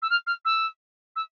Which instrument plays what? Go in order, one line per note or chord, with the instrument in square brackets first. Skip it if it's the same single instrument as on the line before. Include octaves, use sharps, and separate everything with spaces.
[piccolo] E6
F6
F6
E6
E6